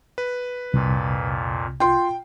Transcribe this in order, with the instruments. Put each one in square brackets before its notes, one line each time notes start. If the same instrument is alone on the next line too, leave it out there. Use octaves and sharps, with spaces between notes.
[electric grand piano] B4
[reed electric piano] C2 [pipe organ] F2 A#2
[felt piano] F4 C6 [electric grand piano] G5